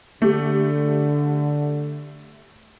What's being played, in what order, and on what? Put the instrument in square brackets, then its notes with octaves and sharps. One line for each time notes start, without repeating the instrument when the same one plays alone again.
[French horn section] D3 [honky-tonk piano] A3 G4